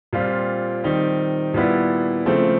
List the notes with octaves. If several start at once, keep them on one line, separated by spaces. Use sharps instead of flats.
A#2 G3 C4 F4
D#3 G3 C4 D#4
A#2 G3 B3 E4
C#3 F3 A3 C4